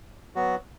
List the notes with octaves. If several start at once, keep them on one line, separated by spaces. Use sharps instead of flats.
F#3 B3 F#4